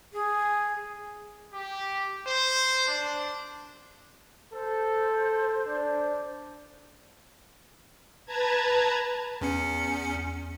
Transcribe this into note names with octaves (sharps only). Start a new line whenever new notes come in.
G#4
G4
C5
D4
A4 C5
D4
B4 A5 A#5 G#6
E2 C#4 C#7